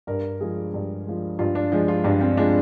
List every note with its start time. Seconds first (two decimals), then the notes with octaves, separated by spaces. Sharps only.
0.07 G2 A#4
0.40 F3 G#3 G#4
0.74 G2
1.06 F3 G#3
1.39 G2 F4
1.55 D4
1.72 F3 G#3
1.88 F4
2.04 G2 D4
2.21 C4
2.37 F3 G#3 D4